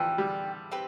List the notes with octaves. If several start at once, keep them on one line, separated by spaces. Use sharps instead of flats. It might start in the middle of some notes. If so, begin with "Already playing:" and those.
Already playing: E3 F3 G4 D5 G5
G3
C4 G4 B4